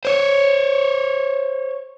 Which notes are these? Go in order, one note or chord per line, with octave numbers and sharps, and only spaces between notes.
C5 C#5